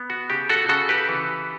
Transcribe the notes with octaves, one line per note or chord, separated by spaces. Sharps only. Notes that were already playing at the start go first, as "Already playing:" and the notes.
Already playing: B3
F#4
C#3 G4
F#4 A4
C#3 F#4 A4
G4 B4
E3